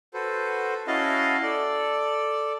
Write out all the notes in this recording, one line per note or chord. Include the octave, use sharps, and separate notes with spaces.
F#4 A4 B4 C5
C#4 E4 F#4 D#5 F5 A5
A4 D5